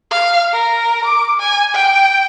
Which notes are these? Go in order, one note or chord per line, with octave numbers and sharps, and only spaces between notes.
F5
A#4
D6
G#5
G5